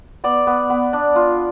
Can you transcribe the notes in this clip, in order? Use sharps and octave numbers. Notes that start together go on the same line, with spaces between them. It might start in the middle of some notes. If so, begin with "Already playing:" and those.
B3 D5
B3
B3
D4
F4